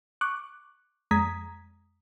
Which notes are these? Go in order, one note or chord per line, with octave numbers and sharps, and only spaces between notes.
C#6 D6 F#6
F2 G#3 A#5 D#6 G#6 B6